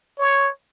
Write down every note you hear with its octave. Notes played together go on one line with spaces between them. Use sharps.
C#5